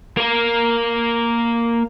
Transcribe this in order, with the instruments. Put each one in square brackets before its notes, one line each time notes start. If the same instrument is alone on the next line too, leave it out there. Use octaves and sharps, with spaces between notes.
[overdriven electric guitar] A#3 A#4